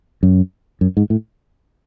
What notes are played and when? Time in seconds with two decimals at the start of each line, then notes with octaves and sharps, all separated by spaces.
0.23 F#2
0.81 F#2
0.97 G#2
1.10 A2